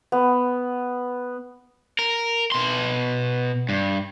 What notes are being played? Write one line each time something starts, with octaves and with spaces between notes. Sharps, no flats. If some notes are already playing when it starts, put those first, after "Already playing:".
B3
A#4
B2 C6
G2